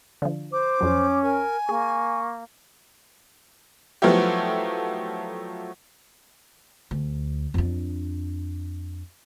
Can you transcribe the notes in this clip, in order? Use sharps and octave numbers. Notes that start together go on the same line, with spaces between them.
D3 F3
C5 D6
F2 F#3 C#4
A#4 G#5
A#3 G#4 C#6
F3 F#3 A3 B3 E4 G4
D2
F2 D4